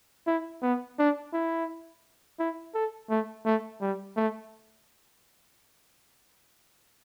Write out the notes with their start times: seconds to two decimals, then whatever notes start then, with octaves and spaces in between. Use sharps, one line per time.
0.27 E4
0.62 B3
0.99 D4
1.33 E4
2.39 E4
2.75 A4
3.10 A3
3.46 A3
3.81 G3
4.17 A3